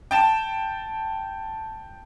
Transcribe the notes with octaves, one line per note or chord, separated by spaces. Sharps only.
G5 A5 E7